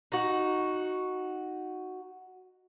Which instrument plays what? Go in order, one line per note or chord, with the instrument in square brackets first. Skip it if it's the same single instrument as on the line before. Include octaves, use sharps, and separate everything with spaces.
[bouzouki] D#4 F#4